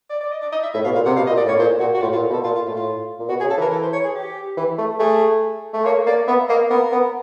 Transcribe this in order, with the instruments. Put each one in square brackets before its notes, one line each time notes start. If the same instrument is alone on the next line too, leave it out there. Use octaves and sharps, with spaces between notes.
[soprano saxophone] D5
D5
D#5
D5
D#5
E5
[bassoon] A2 [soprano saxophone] E5
[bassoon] B2 [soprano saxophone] F5
[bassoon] A#2 [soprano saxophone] F5
[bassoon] C3 [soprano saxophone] F#5
[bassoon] B2 [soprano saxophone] F5
[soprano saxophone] D#5
[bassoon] A#2
[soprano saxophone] D5
[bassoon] A2
[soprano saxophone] C#5
[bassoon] A#2 [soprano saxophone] C5
[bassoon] A#2 [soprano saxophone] F#4
[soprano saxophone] F#4
[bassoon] A2 [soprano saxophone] F4
[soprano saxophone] F4
[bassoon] A#2
B2
[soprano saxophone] A4
[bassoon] A#2 [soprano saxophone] F4
[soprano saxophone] F4
[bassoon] A2
[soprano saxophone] F4
[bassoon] A#2
[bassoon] B2 [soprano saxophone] F#4
[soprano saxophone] G#4
[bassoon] C#3
[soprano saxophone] A4
[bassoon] E3 [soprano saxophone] A#4
[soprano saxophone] A4
C5
C#5
G#4
G4
[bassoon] E3
A3
[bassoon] A3 [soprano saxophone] G#4
[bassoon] A3
[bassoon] A#3 [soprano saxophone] C#5
[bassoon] A#3 [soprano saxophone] D5
[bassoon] B3 [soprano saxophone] E5
[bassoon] A#3 [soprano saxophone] D#5
[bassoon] B3 [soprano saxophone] A#4
[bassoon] B3